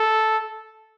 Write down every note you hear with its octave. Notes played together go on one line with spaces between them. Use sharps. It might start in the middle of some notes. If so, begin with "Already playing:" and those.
Already playing: A4